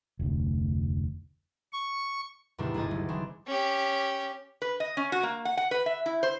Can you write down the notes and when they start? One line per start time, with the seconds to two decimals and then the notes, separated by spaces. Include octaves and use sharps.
0.19 F1 D2
1.73 C#6
2.58 E2 A2 C3 D#3 G#3 D4
2.74 G1 D2 G#4 D#5 A6
2.91 F#1
3.09 E3 F#3 G#3 C4 D4
3.46 C#4 G4
4.62 B4
4.80 D#5
4.97 C#4
5.12 F#4
5.23 A#3
5.45 F#5
5.57 F#5
5.71 B4
5.86 E5
6.06 E4
6.23 C5